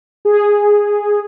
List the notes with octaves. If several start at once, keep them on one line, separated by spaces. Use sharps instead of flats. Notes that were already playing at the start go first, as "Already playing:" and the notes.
G#4